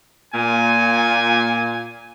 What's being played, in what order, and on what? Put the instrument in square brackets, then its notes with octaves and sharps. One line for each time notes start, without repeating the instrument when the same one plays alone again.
[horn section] A#2 G#5